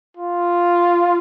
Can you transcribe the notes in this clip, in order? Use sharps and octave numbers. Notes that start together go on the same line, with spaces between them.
F4